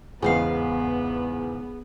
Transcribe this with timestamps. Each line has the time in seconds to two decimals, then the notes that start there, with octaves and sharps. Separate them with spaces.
0.22 E2 G#2 C#3 B3 G#4 F5